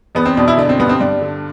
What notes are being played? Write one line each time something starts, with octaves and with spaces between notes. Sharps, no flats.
E2 B3
C4
B2 D4
E4
D3 D4
C4
G2 B3
C4
G2 D4
D3